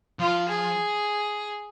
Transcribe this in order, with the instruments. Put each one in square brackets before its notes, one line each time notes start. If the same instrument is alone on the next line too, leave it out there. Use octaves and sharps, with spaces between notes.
[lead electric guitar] F3 [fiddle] F4
[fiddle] G#4